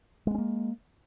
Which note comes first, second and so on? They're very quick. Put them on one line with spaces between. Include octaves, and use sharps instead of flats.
G#3 B3 C#4 A#3